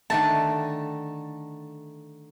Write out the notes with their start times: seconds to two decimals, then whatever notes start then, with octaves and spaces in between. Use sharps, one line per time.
0.10 D3 D#3 A3 A5